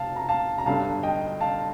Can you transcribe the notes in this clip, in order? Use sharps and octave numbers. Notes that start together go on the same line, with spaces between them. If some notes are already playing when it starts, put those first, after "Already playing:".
Already playing: F1 F5 A5
A#5
F5 A5
A#5
G1 G2 D3 F5 A5
D#5 G5
F5 A5